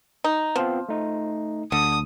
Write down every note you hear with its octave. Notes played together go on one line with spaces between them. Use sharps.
D#4
F3 B3 C4 F4
A3 D#4
D2 D3 D#6